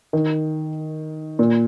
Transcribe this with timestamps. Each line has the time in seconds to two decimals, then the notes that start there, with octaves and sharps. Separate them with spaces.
0.13 D#3
1.39 A#2